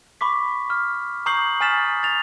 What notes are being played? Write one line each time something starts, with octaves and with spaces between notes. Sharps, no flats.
B5 C#6 D6 B6
F6
A#5 C#6 D#6 G6 C7 F#7
G#5 D#6 F6 A6 B6 E7
A6 F7